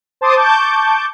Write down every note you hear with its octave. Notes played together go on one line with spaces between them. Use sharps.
C5 A5 C6 D6 D#6
A5 C#6 D6 G6